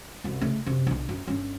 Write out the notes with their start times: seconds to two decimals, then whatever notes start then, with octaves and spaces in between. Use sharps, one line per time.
0.24 C2 F#2
0.41 C#3 A3
0.66 F#2 C3
0.87 B1 D3
1.09 F#2
1.27 G1 C#4